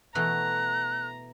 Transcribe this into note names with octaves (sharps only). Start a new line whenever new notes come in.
B2 E3 A3 A#5 F#6